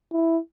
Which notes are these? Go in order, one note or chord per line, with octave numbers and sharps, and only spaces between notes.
E4